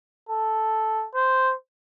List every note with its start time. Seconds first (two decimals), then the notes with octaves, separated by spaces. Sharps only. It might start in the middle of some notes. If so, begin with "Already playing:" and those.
0.29 A4
1.14 C5